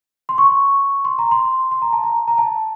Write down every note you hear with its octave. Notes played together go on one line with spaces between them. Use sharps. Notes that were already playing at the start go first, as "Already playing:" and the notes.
C6
C#6
C6
A#5
C6
C6
A#5
A5
A#5
A#5
A5